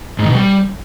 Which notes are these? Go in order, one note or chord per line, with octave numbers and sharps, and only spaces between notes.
G#2
D#3
B2
G3